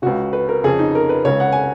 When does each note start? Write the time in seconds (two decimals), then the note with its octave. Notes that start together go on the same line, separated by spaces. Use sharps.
0.02 C#2 C#3 F#4
0.33 B4
0.49 A#4
0.64 F2 C#3 G#4
0.79 D#4
0.95 A#4
1.09 B4
1.25 C#2 C#3 C#5
1.40 F#5
1.52 G#5